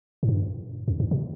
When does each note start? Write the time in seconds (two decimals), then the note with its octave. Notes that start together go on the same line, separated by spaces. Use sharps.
0.23 G#2
0.29 G2
0.88 F2
1.00 G2
1.11 B2